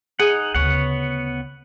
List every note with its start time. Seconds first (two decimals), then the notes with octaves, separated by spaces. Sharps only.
0.20 D#4 G#4 D#5 F#5
0.55 D2 C#3 B3 C#5 F#5